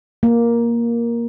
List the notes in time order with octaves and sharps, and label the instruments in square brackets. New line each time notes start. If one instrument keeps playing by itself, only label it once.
[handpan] A#3